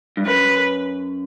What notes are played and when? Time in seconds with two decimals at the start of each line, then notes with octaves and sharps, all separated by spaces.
0.17 G2
0.26 F#2 B4